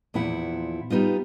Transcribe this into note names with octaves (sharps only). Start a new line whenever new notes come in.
E2 A#2 F3 E4 F#5
G3 B3 D#4 F4